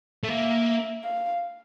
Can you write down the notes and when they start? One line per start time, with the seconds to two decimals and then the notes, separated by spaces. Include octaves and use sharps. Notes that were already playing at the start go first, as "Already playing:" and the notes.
0.23 A3
0.28 A#3 E5
1.04 F5